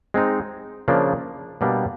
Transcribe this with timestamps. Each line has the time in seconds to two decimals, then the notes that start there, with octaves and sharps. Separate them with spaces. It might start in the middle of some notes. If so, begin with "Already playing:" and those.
0.14 G#3 C4 D#4
0.88 C#3 F3 A#3 D4
1.61 B2 G3 A#3 D4